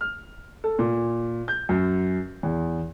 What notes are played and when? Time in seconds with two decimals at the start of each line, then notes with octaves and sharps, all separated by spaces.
0.01 F6
0.64 A4
0.79 A#2
1.48 G6
1.69 F#2
2.43 E2